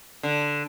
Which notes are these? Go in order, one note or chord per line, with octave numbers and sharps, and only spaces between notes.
D3